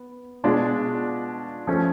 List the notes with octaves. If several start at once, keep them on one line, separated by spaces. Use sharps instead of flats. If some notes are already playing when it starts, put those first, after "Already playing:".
Already playing: B3
B2 G#3 D4 F4
F3 A3 C#4